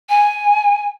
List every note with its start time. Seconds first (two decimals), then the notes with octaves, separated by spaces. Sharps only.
0.09 G#5